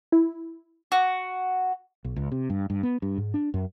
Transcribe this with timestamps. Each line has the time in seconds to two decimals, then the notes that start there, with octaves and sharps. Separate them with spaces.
0.12 E4
0.92 F#4
2.04 B1
2.16 C#2
2.32 C3
2.50 G2
2.70 G2
2.83 B3
3.02 G2
3.18 G#2
3.34 D4
3.54 F#2